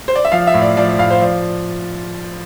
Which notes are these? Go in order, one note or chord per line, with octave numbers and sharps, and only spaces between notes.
C5
D5
E5
F3 F5
E5
A2
D5
F3 D5
A2 F5
C5
F3 D5